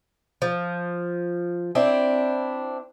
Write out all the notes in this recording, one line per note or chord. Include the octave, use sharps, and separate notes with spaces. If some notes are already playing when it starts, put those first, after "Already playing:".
F3
C4 D4 E4